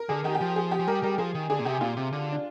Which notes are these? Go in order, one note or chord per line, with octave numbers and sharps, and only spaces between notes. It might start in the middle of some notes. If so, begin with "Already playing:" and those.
Already playing: A#4
D3 G#4
D#3 G4
G4
F3
G#4
G4
F3
G3 A#4
G3 A#4
F3 G#4
D#3
D3 G#4
A#2
C3 G4
A#2 F4
C3
D3
D4